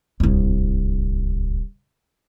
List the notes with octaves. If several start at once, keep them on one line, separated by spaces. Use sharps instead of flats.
D1 C2